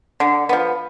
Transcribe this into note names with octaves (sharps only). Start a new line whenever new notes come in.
D3
F3 B3